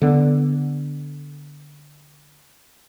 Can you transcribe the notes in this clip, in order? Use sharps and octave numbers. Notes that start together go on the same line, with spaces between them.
D3 B3